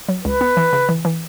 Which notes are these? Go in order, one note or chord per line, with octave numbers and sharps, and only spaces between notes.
F#3
C#2 B4
B3
E3
C#3
E3
E3